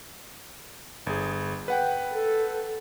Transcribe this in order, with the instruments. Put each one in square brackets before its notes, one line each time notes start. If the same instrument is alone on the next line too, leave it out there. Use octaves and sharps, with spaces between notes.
[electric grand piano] G1 G#4
B4 F#5 G5
[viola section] A4